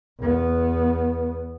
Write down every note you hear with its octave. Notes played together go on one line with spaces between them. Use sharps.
E2 B3